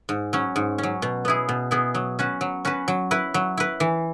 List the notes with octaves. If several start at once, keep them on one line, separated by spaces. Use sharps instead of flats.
G#2
F#3 C#4
G#2
C#4
F#3
B2
B3 E4 G#4
B2
B3 E4 G#4
F#3
C#4 F#4 B4
F#3
C#4 F#4 B4
F#3
E4 B4
F#3
E4 B4
E3